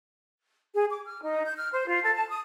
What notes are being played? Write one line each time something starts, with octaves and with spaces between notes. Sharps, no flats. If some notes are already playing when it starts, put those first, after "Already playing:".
G#4
D6
F6
D#4
G6
F6
C5
F4
A4
A5
D#6